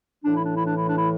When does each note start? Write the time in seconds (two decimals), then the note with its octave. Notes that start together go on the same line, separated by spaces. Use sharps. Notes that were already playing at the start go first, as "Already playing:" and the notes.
0.24 A2 E3 D4
0.35 E4
0.45 D4
0.56 E4
0.66 D4
0.77 E4
0.87 D4
0.98 E4